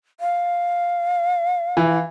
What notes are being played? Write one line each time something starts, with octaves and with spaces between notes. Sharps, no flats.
F5
E3